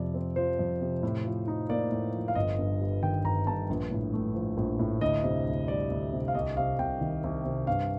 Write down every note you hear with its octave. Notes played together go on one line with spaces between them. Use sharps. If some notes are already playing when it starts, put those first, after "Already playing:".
Already playing: F2 C3 D5
C4
F3 C5
F2
C3
A2
F3
D#4
A#3 D5
A2
F3
F5
G1 D#5
G2
G3
D#3 G5
G1 A#5
G2 A5
A#1
A2
A3
F3
A#1
A2
D2 D#5
C3
D2
G3 D5
D2
C3
F5
C2 D#5
C3 F5
C2 G5
D#3
C2
C3
G2 F5